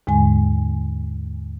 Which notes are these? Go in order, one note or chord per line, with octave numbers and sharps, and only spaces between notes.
D#2 G#2 D3 G#3 G#5